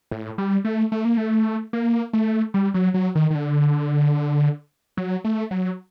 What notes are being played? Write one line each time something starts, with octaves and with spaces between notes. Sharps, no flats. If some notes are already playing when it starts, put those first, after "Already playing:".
A2
G3
A3
A3
A#3
A3
A#3
A3
G3
F#3
F#3
D#3
D#3
D3
F#3
A3
F#3